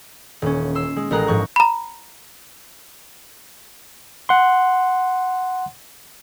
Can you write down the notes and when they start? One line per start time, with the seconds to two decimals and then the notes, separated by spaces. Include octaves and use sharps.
0.42 D#1 C#4
0.75 C6 E6
0.96 G#3
1.11 A1 G#3 A#4 A#5 F#6
1.27 G#2 F3 C#6 F#6
1.56 A#5 B5
4.29 F#5 C6